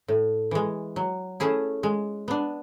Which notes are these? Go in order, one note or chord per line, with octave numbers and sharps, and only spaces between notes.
A2
E3 G#3
F#3
A3 C#4 E4 G#4
G#3
B3 D4